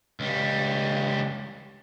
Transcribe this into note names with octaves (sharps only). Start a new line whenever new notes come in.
C#2 G3